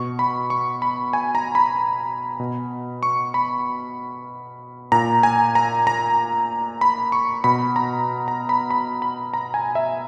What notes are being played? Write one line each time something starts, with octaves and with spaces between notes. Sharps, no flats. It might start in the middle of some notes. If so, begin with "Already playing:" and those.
Already playing: B2 C#6
B5
C#6
B5
G#5
A#5
B5
B2
C#6
B5
A#2 A#5
G#5
A#5
A#5
B5
C#6
B2 B5
A#5
A#5
B5
B5
B5
A#5
G#5
E5